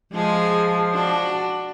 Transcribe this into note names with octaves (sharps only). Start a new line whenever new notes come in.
F3 G#3 G#4
D4 F#4